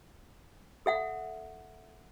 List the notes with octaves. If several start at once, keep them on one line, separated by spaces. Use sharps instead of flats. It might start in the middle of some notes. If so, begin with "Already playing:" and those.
A4 E5 F#5